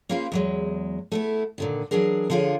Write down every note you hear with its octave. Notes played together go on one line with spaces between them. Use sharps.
A#3 C#4 F4 G#4 B4 C5
E2 F#3 G#3
A3 B3 E4
A#2 D3 D#3
E3 F#3 D4 G#4 A#4
D3 F3 F4 G#4 C#5